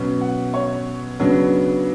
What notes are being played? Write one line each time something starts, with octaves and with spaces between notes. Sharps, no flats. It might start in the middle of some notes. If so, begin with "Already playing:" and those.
Already playing: B2 F#3 C#4
F#5
C#5
C#3 F#3 B3 D4